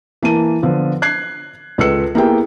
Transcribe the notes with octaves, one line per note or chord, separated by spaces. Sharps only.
E3 A#3 A5 D#7
D3 F3 B3
F#6 G#6 C7
C#2 A4 B4 E6 C#7
A#3 B3 E4 G4 G#4 G5